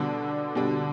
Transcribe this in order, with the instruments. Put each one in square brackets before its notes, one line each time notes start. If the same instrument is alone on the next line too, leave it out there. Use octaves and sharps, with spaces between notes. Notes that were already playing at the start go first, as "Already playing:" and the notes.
Already playing: [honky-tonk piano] B2 G3 D4 [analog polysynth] D3
[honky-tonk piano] B2 G3 D4